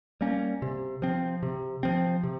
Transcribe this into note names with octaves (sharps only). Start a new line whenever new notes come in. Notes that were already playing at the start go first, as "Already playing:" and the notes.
G3 A#3 C#4
C3
F3 C4
C3
F3 C4
C3